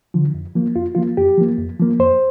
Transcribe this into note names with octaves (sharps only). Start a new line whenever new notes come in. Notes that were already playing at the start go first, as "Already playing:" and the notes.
D3 F3
F2
F3 A#3
F2 F4
F3 A#3 F4
F2 G4
F3 A#3
F2
F3 A#3
F2 C5